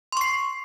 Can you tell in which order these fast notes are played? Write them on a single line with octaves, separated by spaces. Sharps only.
C6 C#6 C7